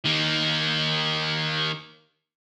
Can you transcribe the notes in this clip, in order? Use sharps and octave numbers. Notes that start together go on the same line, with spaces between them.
D#3 A#3